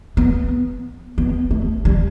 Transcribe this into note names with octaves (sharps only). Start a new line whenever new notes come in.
B3
B3
A3
G3